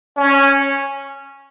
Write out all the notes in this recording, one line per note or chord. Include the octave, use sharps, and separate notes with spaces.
C#4